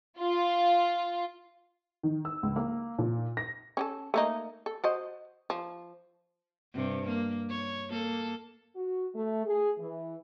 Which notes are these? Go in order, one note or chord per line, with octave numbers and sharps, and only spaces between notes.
F4
D#3
E6
C#2
A#3
A#2
A#6
C#4 G4 A4
A3 A#3 D#4
A4
F#4 C5 D#5
F3
G2 C3
A#3
C#5
A#3 A4
F#4
A3
G#4
E3